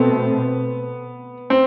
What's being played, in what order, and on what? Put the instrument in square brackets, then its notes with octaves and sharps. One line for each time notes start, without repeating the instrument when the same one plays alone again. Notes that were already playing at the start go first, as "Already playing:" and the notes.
Already playing: [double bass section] B2 A3 C4 [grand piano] B3
[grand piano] C4